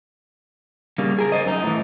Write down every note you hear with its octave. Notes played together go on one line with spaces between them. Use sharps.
C#3 G3 A#3
G#4 A#4
C5 D#5
F#2 D#4
A2 E3